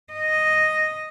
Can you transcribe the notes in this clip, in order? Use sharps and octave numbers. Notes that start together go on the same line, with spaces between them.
D#5